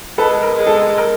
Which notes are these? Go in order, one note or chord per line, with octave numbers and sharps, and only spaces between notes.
G#3 A4 B4
A#4
G#3
A4
A#4